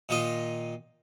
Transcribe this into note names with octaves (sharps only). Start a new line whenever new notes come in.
A#2 D#3 F4 D#5